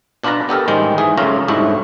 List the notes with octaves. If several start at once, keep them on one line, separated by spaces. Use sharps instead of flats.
B2 D4 F4 B4 D5 A#5
B3 G4 A4 A#4
A1 D#3 G3 G#3 C5 G5
G#2 E3 G#4
C#2 F#2 C#3 A3 F4 A#5
C2 G#2 F#3 A3 D4 E4